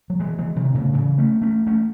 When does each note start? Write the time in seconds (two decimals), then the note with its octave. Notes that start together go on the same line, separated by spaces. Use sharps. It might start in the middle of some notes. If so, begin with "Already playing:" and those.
0.10 F#3
0.20 E3 G#3
0.38 E3 G#3
0.56 C3 D#3
0.74 A2 C#3
0.93 C#3 E3
1.18 A3 C#4
1.42 A3 C#4
1.67 A3 C#4